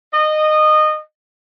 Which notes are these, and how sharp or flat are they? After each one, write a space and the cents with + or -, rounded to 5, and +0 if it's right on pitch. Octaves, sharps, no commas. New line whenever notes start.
D#5 -20